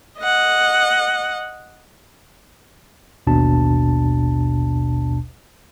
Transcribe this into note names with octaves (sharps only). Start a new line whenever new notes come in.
D#5 F#5
A1 D#2 B2 D4 A5